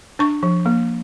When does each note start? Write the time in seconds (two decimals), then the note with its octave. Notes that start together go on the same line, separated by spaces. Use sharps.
0.19 D4 C#6
0.43 F3
0.66 A#3